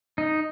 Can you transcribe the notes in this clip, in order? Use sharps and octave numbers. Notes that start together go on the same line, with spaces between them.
D#4